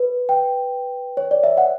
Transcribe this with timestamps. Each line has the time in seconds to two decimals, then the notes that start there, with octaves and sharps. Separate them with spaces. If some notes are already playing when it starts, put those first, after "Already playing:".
Already playing: B4
0.29 G5
1.17 C#5
1.31 D5
1.44 E5
1.57 F#5